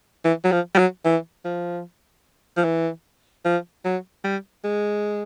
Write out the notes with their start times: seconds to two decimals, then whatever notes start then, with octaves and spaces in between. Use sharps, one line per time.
0.25 E3
0.44 F#3
0.52 F3
0.75 G3
0.78 F#3
1.05 E3
1.45 F3
2.57 F3
2.64 E3
3.45 F3
3.85 F#3
4.24 G3
4.64 G#3